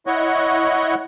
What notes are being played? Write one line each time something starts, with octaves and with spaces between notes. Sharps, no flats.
E4 C#5 D#5 F#5 C#6